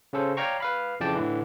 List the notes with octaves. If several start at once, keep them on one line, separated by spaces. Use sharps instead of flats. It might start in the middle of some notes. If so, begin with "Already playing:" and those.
C#3 C#4 A4 C5
C#5 D5 F5 G5 A#5 C#6
B4 F5 B5
F2 C#3 E3 D5 G5 A5
A2 D3 E3